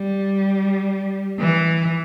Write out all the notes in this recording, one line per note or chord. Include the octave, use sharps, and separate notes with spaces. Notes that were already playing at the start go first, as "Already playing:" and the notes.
Already playing: G3
E3